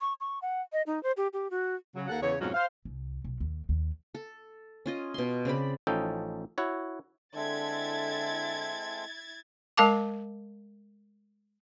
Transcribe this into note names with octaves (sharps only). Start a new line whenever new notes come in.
C#6
C#6
F#5
D#5
D#4
C5
G4
G4
F#4
C#3 F#3
D#2 A#3 A4 F#5
E2 C#3 B3 C#5
F2 G#2 B2 F3 F#3 C#4
C5 F5
C2
B1
D#2
D#2
A4
C#4 F4 D#5
B2 C6
C#3 C4 D5 B5
A1 F3 C#4 D#4 A4 G5
E4 F#4 C#5
D3 G#3 C4 E4 A4 E5 G#6 A6
G#3 A#4 F5 A5 D6